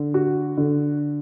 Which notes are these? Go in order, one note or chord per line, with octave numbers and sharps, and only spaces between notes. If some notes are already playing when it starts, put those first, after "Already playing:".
Already playing: D3
F#4
D3